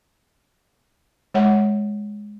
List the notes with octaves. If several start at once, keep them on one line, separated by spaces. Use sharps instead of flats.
G#3 C#5 F#5